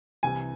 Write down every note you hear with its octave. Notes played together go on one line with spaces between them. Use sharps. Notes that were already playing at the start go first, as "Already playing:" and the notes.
C2 C3 E3 G#5